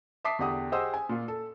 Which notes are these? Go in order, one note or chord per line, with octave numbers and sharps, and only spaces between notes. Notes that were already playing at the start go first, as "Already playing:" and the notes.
E5 A5 D6 D#6 B6 C7
E2 D3 G4 F#5 D#6
G4 G#4 C5 D#5 F#5 E6
G#5
A#2 F4
A4